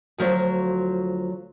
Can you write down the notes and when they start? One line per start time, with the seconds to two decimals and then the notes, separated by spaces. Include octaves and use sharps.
0.18 D2 F3 F#3 C#5